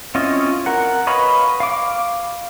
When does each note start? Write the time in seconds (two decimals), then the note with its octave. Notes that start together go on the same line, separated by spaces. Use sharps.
0.15 C4 C#4 E4 F4 D#5
0.66 A#4 F#5
1.07 B4 C#5 D#5 F5 B5
1.60 F5 D6